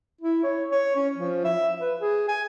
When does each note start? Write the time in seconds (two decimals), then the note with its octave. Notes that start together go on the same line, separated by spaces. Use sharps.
0.21 E4
0.43 C#5
0.71 C#5
0.96 C#4
1.17 F3
1.44 E5
1.81 B4
2.01 G#4
2.28 G#5